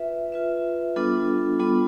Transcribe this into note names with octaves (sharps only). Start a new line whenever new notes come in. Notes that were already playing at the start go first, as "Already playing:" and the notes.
Already playing: F4 B4 E5
F4 B4 E5
G3 B3 D4 F4 A4
G3 B3 D4 F4 A4